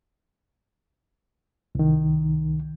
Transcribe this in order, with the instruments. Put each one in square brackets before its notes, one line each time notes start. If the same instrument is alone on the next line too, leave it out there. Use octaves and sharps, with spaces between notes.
[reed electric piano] C2 D#3